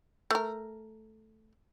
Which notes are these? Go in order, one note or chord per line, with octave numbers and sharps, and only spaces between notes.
A3 A#4